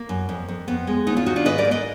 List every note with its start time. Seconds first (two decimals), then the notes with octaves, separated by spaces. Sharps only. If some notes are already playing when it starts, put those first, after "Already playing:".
Already playing: A#3
0.09 F#2
0.29 F2
0.48 F2
0.68 F2 B3
0.87 G#3
1.07 D#2 B3 D#4
1.17 D4 F4
1.26 D#3 D#4 F#4
1.36 D4 F4
1.45 G#2 B4 D#5
1.58 A#4 D5
1.65 A#3
1.71 B4 D#5